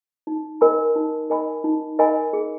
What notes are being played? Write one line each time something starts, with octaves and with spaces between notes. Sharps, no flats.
D#4
A#4 D#5 G#5 B5
D#4
A#4 D#5 G#5 B5
D#4
A#4 D#5 G#5 B5
G#4